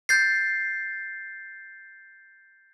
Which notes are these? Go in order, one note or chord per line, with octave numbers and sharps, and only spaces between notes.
G6 A6 C7